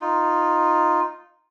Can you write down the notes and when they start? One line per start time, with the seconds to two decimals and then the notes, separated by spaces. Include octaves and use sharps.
0.01 D#4 F4